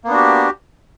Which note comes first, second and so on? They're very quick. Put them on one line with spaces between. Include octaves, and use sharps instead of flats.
A#3 B3 D4 F#4 G4